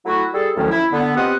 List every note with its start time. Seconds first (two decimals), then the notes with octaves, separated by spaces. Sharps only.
0.06 F#3 A3 E4 F#4
0.33 G3 G#4 A4
0.56 D2 A2 D#3 F3 F#3 C#4
0.71 E4
0.92 D3 B3
1.15 B3 C4 F4 G4 D#5 F#5